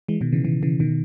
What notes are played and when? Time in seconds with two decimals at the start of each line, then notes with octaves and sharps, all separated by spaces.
0.08 E3 G#3
0.21 B2 D#3
0.32 C#3 E3
0.44 C#3 E3
0.63 C#3 E3
0.80 B2 D#3